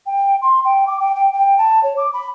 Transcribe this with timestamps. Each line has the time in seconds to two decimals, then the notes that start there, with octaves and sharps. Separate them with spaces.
0.06 G5
0.42 C6
0.65 G5
0.87 D6
1.00 G5
1.15 G5
1.33 G5
1.58 A5
1.83 C#5
1.97 D6
2.13 B5